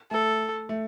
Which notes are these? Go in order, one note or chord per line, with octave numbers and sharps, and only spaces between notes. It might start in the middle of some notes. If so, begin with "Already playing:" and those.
A3 A4
A3